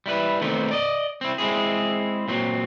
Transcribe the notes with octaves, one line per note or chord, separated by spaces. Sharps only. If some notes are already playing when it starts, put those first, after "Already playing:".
G3 E4 B4
D#3 A3 B3 C4 D#4
D5 D#5
C4 E4
G#3 C4 E4 G#4
A#2 F#3 C4